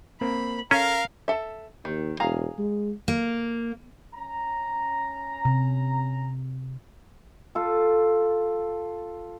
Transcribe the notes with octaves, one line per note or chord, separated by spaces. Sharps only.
A#3 C4 A#4 B5
C#4 A4 A#4 F5
A4 E5
D#2 D#3
E1 G#4 F5 A#5
G#3
A#3
C#4 A#5
C3
F4 A4